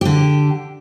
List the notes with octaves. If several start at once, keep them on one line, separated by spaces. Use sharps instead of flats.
D3 G4